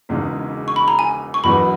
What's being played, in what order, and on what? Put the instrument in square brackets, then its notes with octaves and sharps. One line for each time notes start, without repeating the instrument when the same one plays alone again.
[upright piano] E1 E2 C#3 G#3 D#4
[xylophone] C#6
B5
A#5
G#5
C#6
[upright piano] E1 E2 B2 F#3 B3 [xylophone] B5